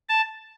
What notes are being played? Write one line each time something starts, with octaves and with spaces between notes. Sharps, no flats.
A5